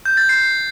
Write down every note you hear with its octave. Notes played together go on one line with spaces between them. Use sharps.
G6
A6
C7